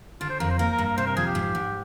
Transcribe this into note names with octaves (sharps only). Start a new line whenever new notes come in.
D3 F4
C5
F2 A#4
C5
A#3 A#4
A#4
G2
A#4
C3 C5
A#4
F3 G#4
G4
G#2
G#2